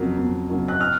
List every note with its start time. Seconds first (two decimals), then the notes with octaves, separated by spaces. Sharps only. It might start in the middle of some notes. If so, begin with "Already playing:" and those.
Already playing: F2 C#3 F#3 A#3
0.18 F2
0.49 C#3 F#3 A#3
0.68 F#6
0.81 F6